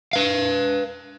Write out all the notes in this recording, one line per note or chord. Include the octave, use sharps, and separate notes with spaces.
B4 F5